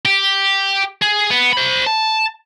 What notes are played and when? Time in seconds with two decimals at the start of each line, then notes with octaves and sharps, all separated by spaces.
0.05 G4
1.02 G#4
1.31 B3
1.53 C5 B5
1.86 A5